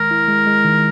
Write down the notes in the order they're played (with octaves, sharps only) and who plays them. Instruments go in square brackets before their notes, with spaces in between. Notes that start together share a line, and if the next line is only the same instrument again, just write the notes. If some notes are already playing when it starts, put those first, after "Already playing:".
Already playing: [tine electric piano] D#3 G#3 [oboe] A#4
[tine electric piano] E4
G#3
G#3
D#3